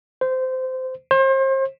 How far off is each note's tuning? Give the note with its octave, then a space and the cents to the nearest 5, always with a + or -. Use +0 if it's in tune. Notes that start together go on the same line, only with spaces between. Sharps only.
C5 -20
C5 +35